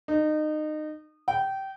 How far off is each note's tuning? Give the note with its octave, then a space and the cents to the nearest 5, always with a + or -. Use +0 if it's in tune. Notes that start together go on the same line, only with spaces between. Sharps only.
D#4 -25
G5 -20